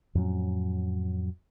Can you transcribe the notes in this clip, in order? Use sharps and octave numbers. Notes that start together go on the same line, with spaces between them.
F2 A2 F#3 C#4